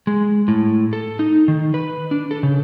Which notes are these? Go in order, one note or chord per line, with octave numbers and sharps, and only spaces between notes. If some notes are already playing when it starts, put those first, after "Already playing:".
G#3
A2
A4
D#4
D#3
B4
D4
A4
C#3